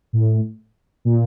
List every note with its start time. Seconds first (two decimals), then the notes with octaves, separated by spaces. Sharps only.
0.13 A2
1.05 A#2